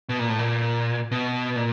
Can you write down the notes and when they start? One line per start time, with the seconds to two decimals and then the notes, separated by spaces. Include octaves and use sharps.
0.09 B2
0.19 A#2
0.29 A2
0.39 A#2
1.11 B2
1.56 A#2